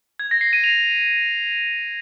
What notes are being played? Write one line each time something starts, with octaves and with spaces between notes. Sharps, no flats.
G#6
A#6
C7
D#7
F7